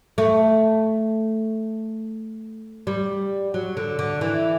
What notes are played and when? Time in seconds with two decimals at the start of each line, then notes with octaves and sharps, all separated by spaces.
0.18 A3
2.87 G3
3.54 F#3
3.77 D3
3.99 D3
4.21 E3